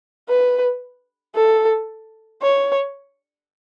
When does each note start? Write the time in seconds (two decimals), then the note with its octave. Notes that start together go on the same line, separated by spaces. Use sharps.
0.29 B4
1.35 A4
2.42 C#5